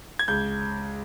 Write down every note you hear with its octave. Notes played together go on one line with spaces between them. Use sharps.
G#6
C#2 G6